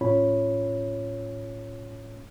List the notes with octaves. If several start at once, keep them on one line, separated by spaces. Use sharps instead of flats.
A2 C#4 F4 C#5 B5